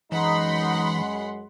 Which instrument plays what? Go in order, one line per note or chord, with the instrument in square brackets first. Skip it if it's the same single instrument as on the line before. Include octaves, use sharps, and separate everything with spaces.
[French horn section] F#2 G#3 [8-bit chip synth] E3 [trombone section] D#4 [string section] F#5 B5 C6